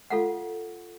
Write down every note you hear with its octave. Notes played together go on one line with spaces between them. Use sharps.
F4 A4 F5 F#5